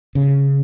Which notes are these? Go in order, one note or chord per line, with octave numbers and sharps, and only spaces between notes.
C#3